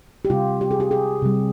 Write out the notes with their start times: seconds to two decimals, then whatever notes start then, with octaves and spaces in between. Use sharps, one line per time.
0.25 G4
0.30 C3 G3 F4
0.61 G4
0.71 G#4
0.80 G4
0.91 G#4
1.22 C3 G3